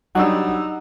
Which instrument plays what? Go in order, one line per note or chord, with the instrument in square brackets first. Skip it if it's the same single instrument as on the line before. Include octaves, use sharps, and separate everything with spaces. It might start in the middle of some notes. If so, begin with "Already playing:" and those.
[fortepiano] F#3 G3 D4 [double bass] D#4 [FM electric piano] F#5 E6